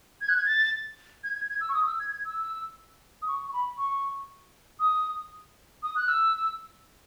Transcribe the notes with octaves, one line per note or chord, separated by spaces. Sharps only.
G#6
F#6
G#6
A6
G#6
G#6
G#6
E6
C#6
D#6
E6
G#6
G#6
E6
D#6
C#6
C#6
B5
C#6
D#6
D#6
F#6
E6